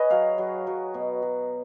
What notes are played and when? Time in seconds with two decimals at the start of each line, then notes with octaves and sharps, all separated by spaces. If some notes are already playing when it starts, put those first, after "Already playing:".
Already playing: G#4 B4 C#5 D#5
0.10 F#3 F5
0.38 F#3
0.67 F#3
0.94 B2
1.22 F#3